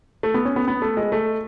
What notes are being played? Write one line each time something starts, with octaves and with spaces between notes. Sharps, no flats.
A3
B3
C#4
B3
B3
A3
G#3
A3